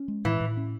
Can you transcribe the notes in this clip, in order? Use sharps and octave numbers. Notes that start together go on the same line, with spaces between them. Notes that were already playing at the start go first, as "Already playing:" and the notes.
Already playing: C#4
G#3
A2 E3
A2
C#4